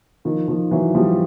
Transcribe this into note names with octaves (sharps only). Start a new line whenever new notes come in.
D#3 F3
D#3 F3
E3 F#3
F3 G3